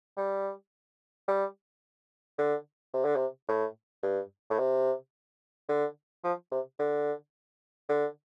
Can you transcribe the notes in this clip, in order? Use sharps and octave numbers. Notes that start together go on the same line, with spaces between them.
G3
G3
D3
C3
D3
C3
A2
G2
A2
C3
D3
F3
C3
D3
D3